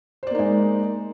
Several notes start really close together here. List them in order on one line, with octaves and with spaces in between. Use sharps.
C5 D5 A#3 D#4 G#3